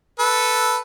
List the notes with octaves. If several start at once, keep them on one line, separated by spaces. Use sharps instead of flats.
A4 B4